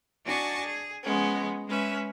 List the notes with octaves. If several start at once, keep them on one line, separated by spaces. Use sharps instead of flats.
D4 F#4 D#5 G#5 A5 C#6
G#4
F3 G#3 B3 C#4
G#3 C#4 B4 E5